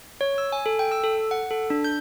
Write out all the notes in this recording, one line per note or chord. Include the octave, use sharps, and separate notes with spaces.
C#5
E6
G#5
A4
G5
E6
A4
F#5
A4
D4
G6